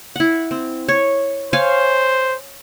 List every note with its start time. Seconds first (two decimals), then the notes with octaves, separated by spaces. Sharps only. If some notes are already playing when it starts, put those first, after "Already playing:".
0.16 E4 F#5
0.51 C4
0.88 C#5
1.53 C5 C#5 F5 G#5